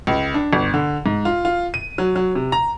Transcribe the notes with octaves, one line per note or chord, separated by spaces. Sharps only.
C#2
D4
G1
D3
G#2
F4
F4
D#7
F#3
F#3
C3
A#5